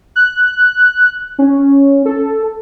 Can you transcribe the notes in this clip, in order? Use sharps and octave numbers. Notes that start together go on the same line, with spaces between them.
F#6
C#4
A4